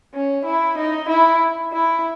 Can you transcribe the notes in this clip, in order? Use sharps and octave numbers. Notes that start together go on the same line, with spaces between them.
C#4
E4
D#4
E4
E4